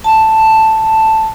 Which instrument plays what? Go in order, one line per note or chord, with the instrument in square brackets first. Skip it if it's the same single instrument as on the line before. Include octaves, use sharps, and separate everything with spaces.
[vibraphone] A5